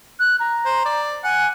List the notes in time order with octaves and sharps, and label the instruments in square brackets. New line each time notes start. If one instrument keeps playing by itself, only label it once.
[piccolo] F#6
A#5
[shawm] C5
D5
[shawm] F#5 [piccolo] G#5